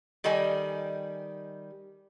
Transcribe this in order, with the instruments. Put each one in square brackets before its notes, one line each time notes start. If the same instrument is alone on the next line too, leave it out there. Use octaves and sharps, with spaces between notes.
[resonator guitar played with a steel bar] D#3 G3 A4 D#5 G#5